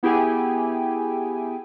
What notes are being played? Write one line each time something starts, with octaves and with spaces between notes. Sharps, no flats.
B3 E4 G4 G#4 G5 G#5